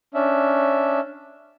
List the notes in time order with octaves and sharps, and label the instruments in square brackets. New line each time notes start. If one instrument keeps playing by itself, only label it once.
[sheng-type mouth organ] C#4 D4 E5